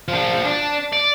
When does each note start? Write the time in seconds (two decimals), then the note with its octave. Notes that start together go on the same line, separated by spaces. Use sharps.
0.08 F3 D4
0.45 D4
0.93 D5